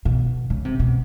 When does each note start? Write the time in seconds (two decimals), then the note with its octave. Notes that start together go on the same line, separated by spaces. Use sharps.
0.05 B2
0.50 C#3
0.65 C3
0.79 B2